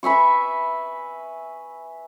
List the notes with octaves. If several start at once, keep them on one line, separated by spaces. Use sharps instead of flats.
B4 E5 G#5 C#6